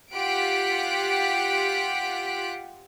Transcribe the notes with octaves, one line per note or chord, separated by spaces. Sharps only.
F4 G4 F#5 F#6 B6 D7